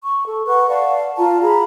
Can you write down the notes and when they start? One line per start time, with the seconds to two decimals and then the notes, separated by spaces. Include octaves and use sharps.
0.04 C#6
0.26 A4
0.46 B4 F#5 C#6
0.68 D5 F5 F#5 A5
1.18 F4 A5 A#5
1.42 G#4 A#5 B5